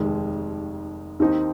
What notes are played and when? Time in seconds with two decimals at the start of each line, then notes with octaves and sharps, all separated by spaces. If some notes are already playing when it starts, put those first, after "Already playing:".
Already playing: F1 D#2 D#3 G#3
1.20 D#2 D#3 C4 D#4